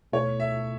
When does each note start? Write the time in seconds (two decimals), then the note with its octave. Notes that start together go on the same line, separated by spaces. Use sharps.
0.13 B2 A3 E4 A4 C#5
0.40 E5